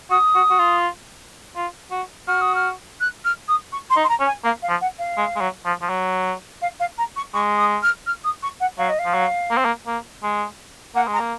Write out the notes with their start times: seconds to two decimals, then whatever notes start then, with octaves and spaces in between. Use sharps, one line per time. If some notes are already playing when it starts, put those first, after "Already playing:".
0.10 F#4 D#6
0.35 F#4
0.50 F#4
0.59 F4
1.56 F4
1.91 F#4
2.27 F#4 F6
2.41 D#6
2.55 F6
3.00 F#6
3.24 F6
3.48 D#6
3.72 C#6
3.90 C6
3.96 D#4
4.04 C6
4.09 A#5
4.20 C#4
4.26 G#5
4.44 A#3 F5
4.62 F5
4.69 F3
4.81 F#5
4.98 F5
5.18 G#3
5.36 G#3
5.41 F#3
5.66 F3
5.82 F3
5.90 F#3
6.62 F5
6.80 F5
6.98 A#5
7.16 C#6
7.34 G#3 C#6
7.58 D#6
7.82 F6
8.06 F6
8.24 D#6
8.43 C#6
8.60 F#5
8.78 F#3 F5
8.89 D#5
8.99 F5
9.05 F3
9.14 F#3
9.51 A#3
9.58 C4
9.65 A#3
9.87 A#3
10.23 G#3
10.95 A#3 F#5
11.08 G#3
11.13 A#5
11.20 A#3